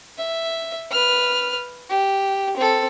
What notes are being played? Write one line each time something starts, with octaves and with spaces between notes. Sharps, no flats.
E5
B4 F6
G4
C4 A4